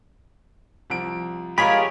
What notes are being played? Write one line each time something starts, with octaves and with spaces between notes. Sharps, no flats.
C2 F3 D7
G#3 F4 G4 G#4 A#4 C#5 B5